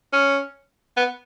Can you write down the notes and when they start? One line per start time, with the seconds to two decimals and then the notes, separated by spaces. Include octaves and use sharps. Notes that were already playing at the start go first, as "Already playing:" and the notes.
0.13 C#4
0.97 B3